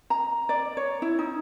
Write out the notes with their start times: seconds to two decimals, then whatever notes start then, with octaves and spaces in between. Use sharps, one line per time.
0.10 A#5
0.49 D5
0.77 C#5
1.02 E4
1.19 D#4